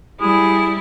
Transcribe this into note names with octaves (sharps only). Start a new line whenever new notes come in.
G3 E4 G#4